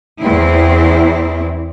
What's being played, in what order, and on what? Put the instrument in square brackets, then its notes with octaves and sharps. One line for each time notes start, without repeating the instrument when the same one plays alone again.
[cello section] E2 C4 E4